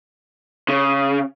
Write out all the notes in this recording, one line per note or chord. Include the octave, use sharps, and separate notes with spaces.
C#3